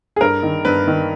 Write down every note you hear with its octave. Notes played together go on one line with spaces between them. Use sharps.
G#4
G2 A#4
D#3
G2 B4
D#3